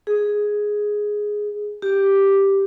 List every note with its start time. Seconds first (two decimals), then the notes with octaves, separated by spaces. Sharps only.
0.07 G#4
1.82 G4